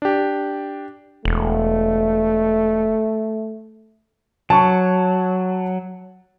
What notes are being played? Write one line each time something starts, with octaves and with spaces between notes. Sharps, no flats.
D4 G4
E1 A3
F#3 A5 C#6